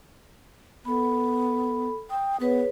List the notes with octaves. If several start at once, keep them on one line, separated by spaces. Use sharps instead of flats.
B3 A4 B5
G5 D#6
B3 G#4 B4 C#5